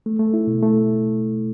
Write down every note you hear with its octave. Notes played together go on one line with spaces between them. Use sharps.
A3
A3
E4
B2
A3